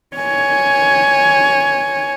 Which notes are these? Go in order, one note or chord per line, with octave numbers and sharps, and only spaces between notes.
C#5 G#5